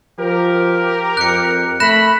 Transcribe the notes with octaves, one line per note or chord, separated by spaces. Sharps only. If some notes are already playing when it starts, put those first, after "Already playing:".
F3 G4 A#4
F2 F#6 C#7
A3 B5 F#6 A#6 E7